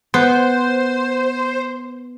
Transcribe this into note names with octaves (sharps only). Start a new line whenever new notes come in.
B3 C5